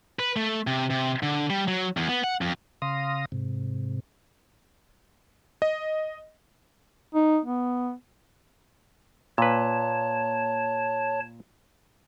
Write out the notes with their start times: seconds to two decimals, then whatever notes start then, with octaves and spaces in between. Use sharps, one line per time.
0.19 B4
0.36 A3
0.67 C3
0.90 C3
1.23 D3
1.50 G3
1.68 F#3
1.97 E2
2.09 B3
2.24 F#5
2.41 F2
2.82 C#3 F5 C6 D#6 A#6
3.32 G#2 C3
5.62 D#5
7.14 D#4
7.45 B3
9.38 A#2 B4 C#5 A5